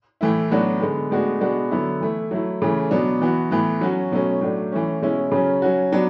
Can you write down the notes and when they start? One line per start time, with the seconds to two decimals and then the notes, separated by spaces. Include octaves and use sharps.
0.21 A2 E3 A3 E4
0.51 A2 F#3 B3 D4 F#4
0.81 D3 G#3 B3
1.11 A2 G#3 B3 D4 F#4
1.41 B2 G#3 B3 D4 F#4
1.71 D3 F#3 B3 E4
2.01 E3 A3 E4
2.31 F#3 A3 E4
2.62 C#3 E3 A3
2.91 B2 F#3 B3 D4
3.21 E3 B3 F#4
3.51 A2 E3 B3
3.81 F#3 C#4 F#4
4.12 B2 F#3 A3 C#4
4.41 A2 F#3 A3 D4
4.72 E3 A3 C#4
5.02 B2 G#3 C#4 E4
5.32 C#3 F#3 C#4
5.62 F#3 C#4 F#4
5.92 F#3 B3 D4